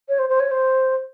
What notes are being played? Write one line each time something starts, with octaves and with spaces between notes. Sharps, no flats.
C#5
C5
C5
C#5
C5